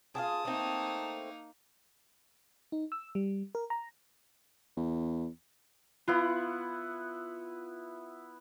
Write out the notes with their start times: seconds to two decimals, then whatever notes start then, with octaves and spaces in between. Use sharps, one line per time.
0.15 F4 G4 G#4 A5 D#6
0.45 A3 A#3 C4 D#4
2.72 D#4
2.92 E6
3.15 G3
3.55 A#4
3.70 A#5
4.77 E2
6.08 B3 E4 F4 F#5